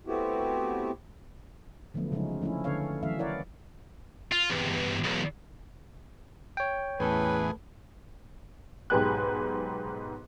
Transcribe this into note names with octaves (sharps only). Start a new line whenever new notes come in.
A3 B3 C4 E4 F#4 G4
D3 F3 F#3 A3 B3
C#3 F3 F#3 G#3 C#4 D#4
F3 A3 C#4 D4 E4
D3 C#4 A4 B4 C#5 F5
E3 F#3 A3 C#4 E5 F5
E4 A#4 C#5 D5 F5 F#5
F4
E2 G2
B1 E2
C#5 G5
E2 A2 C#4 G#4 A4 B4
B1 G#2 G4 B4 G#5 F#6